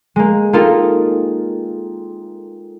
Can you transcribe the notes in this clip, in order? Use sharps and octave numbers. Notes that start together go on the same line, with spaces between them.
G#3 A#3
A#3 C4 D#4 F4 A4 A#4